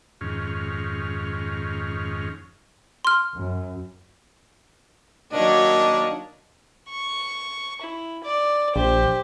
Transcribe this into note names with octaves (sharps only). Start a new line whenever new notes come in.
F2 G#2 D#3 C#4 F6
C6 F6
F#2
D#3 F#3 A#3 D4 C#5 D#5
C#6
E4
D5
A#1 G4 C5